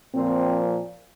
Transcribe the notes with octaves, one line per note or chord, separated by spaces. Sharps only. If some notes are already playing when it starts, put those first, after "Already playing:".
A#2 F3 C4